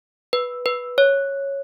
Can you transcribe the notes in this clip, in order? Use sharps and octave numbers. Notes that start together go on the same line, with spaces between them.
B4
B4
C#5